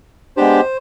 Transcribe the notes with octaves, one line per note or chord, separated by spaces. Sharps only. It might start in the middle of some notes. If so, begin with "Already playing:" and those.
G#3 B3 D4 G4 C5